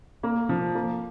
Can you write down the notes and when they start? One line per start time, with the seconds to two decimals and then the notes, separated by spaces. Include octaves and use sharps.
0.23 A#3
0.49 F3
0.75 A#3